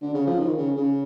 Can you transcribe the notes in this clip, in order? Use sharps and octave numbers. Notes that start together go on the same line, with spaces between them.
D3
C#3
F3
D#3
C#3
C#3